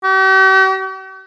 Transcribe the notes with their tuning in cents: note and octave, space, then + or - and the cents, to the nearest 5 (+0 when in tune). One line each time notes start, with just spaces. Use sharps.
G4 -45